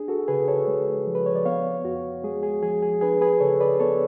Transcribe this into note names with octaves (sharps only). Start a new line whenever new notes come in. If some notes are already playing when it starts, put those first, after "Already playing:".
Already playing: D4 G#4
F#4 A4
C#3 G#4 B4
A4 C#5
G#3
F3
B4
C#5
D5
B3 C#5 F5
F2 F#4
G#3 G#4
G#4
F3 G#4
G#4
D4 G#4 B4
G#4 B4
C#3 A4 C#5
B4 D5
B3 A4 C#5